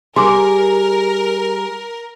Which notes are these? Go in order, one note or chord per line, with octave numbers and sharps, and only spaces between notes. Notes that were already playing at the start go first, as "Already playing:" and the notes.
G3 G#4 A#4 C6 D6